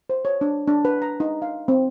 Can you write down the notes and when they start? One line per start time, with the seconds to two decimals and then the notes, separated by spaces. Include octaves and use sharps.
0.10 C5
0.25 C#5
0.41 D4
0.68 D4
0.85 B4
1.02 A#5
1.20 D#4
1.42 F5
1.68 C4